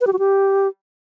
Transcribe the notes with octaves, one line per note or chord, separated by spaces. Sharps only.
B4
G4
F#4
G4